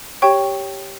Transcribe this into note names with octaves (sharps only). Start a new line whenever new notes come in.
G4 C#5 G5 C#6